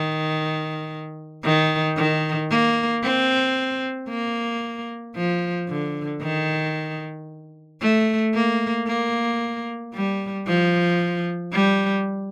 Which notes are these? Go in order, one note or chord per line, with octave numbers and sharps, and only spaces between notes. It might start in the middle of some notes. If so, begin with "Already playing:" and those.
Already playing: D#3
D#3
D#3
A#3
C4
A#3
F3
D3
D#3
A3
A#3
A#3
G3
F3
G3